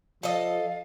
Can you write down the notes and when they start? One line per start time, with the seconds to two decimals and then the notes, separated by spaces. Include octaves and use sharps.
0.23 F3 A4 D#5 F5